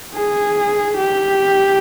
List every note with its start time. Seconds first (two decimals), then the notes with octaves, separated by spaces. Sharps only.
0.15 G#4
0.98 G4